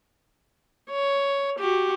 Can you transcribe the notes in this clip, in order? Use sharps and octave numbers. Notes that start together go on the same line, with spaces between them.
C#5
F#4 G4